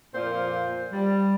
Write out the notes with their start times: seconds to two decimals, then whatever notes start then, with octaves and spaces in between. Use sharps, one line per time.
0.14 F2 A#2 A#3 F4 C5
0.93 G3